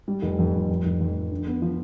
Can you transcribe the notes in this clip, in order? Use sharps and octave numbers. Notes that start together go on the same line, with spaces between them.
G3
F1
F2
F2
F2
F1
F2
F2
D3
B3
F3